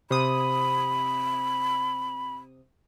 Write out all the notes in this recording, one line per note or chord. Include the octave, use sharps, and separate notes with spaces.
C3 B5 D#6